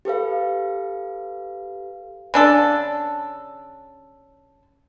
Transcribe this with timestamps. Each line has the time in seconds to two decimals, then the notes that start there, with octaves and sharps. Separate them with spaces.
0.05 G4 A4 B4 F5
2.34 C#3 D4 A4